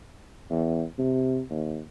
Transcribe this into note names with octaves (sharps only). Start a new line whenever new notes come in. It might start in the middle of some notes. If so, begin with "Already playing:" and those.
E2
C3
D#2